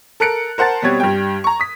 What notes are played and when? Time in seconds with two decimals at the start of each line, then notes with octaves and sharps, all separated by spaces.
0.20 A4 A#4 F#6 C#7 D7
0.58 A#4 C5 F#5 A5 A6
0.82 B2 G3 B3 C4 C#5 G#6
1.00 G2 G3 G5
1.44 A#5 C#6
1.60 D#6 B6